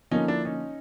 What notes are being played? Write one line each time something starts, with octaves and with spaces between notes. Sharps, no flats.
D3 F3 A#3 C#4 D#4
D4 E4
C#4 D#4